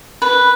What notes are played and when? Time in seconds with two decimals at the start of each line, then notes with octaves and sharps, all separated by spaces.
0.22 B4